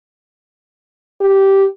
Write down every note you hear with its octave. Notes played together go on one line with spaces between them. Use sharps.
G4